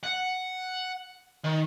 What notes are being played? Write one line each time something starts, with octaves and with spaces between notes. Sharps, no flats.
F#5
D#3